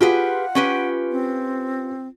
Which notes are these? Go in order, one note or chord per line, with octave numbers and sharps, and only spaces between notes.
F4 G4 G#4 B4 F#5
C#4 G4 B4
C4